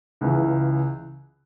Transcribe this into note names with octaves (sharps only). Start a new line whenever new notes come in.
C#2 C#3 E3